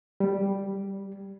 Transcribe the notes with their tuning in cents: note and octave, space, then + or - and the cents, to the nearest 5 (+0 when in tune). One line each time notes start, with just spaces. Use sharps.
G3 +0 G4 +0